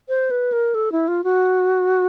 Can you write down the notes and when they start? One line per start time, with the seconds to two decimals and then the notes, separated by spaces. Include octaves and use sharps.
0.09 C5
0.31 B4
0.52 A#4
0.74 A4
0.92 E4
1.08 F4
1.24 F#4